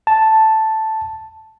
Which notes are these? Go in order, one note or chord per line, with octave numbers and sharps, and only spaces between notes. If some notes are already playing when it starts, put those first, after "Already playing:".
A5